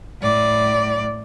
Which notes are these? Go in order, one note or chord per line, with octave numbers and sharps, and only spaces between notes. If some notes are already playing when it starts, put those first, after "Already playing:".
A2 D5